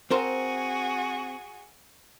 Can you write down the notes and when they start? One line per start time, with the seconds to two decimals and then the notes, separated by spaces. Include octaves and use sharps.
0.11 C4 F#4 G#4 A#4 C5